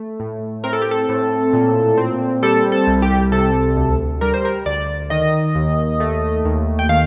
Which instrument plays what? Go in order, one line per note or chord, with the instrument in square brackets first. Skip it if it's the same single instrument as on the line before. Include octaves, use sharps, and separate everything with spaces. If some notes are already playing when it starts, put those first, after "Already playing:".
Already playing: [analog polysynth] A3
A2
C4 A#4
A4
G4
A4
A2
A#2
C4
G3 A4
A4
C2
G4
C3 A4
D2
G3 A#4
C5
A#4
D2 D5
D#3 D#5
D#2
A3
D#2
G5
D#3 F5